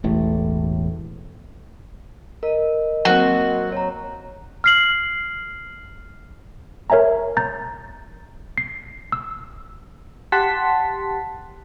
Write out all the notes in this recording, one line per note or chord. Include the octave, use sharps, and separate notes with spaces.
E1 A1 A2
A#4 D#5
F#3 A#3 C4 F#4
C#5 A#5
F6 C7 F#7
A#4 C#5 E5 G#5 A#5
A#5 G6 A6
C7
E6
G4 F#5 A5 C6 B6